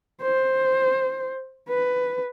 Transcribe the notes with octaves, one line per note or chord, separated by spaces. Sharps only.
C5
B4